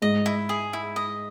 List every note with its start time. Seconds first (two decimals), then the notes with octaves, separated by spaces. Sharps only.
0.02 G#2 D#5
0.26 E4
0.49 G#4
0.73 E4
0.96 D#5